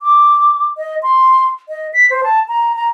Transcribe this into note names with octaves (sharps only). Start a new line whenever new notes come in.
D6
D#5
C6
D#5
B6
C5
A5
A#5
A#5